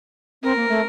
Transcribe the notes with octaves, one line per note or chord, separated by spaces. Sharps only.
C4 A#4
A#3
A3